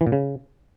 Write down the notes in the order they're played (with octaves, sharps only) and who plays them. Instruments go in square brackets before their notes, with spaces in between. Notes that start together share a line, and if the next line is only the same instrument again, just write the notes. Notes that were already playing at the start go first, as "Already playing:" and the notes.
[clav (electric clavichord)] E3
A#2
C#3